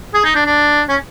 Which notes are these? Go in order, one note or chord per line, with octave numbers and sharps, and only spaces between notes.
G#4
D#4
D4
D4
C#4